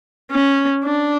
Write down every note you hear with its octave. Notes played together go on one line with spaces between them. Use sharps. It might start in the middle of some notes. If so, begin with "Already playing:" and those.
C#4
D4